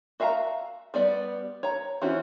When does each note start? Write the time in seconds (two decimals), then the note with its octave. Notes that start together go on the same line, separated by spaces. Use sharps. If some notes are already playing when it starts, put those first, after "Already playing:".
0.20 F#4 E5 F5 G5 A#5
0.94 G3 B3 D5
1.63 C#5 A#5
2.01 E3 C4 C#4 E4 F#4